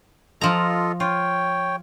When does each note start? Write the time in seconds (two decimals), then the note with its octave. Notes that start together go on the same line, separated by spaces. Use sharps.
0.41 F3 F4 A4 D#5 A#5
1.00 F4 C#5 G5